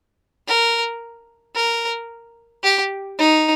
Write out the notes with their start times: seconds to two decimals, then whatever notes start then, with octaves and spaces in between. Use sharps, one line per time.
0.48 A#4
1.55 A#4
2.64 G4
3.18 D#4